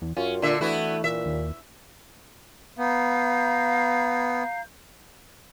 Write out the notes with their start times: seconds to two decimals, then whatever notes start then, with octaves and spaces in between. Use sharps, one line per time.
0.02 E2
0.17 F#2 C#4 F4
0.42 A#2 D3 E5
0.61 E3 A3 B3 E4 F#4
1.04 A#2 E5
1.26 D#2
2.78 B3 F5 A#5 G6